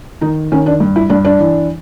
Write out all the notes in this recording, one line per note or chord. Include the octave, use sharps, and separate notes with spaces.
D#3 D#4
D#3 C#4
D4
G2
E4
G2 D4
D4
E3